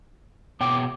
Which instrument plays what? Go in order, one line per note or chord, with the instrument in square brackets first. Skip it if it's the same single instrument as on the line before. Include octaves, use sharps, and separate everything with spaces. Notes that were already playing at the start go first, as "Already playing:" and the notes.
[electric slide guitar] B2 C#5 G5 [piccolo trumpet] D6